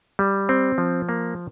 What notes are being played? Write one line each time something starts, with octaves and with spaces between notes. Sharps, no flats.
G3
C4
F3
A#3